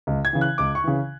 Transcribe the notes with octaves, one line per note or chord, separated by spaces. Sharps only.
C#2
G#6
C#3 E3
F#6
C#2 D6
C#6
C#3 E3